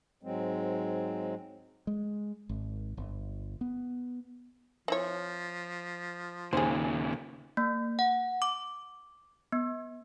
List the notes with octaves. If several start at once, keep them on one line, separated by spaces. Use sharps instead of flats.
G#2 F#3 G#3 C4
G#3
G#1
G1
B3
F3 C4 E4 C#5
D#2 A#2 C#3 G#4 C5
A#3
F#5
D6
B3